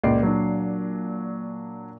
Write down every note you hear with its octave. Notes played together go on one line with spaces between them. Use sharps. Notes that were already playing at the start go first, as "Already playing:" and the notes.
C#2 A#2 D5 C7
F#3 D4